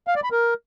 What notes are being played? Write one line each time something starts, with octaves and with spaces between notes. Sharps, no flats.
F5
D5
B5
A#4